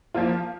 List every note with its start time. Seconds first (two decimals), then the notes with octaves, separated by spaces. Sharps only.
0.14 F3 A#3 F4